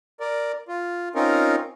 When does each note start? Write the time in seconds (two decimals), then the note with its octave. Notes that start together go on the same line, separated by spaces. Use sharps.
0.20 A#4 D5
0.68 F4
1.15 C4 C#4 D#4 F4 A#4